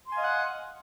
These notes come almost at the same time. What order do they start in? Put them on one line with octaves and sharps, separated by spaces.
C6 G#5 F5 D#5 F#5